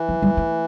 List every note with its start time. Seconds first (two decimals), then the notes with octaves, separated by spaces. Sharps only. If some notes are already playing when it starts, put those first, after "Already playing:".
Already playing: E3
0.09 F3
0.22 G3
0.37 A3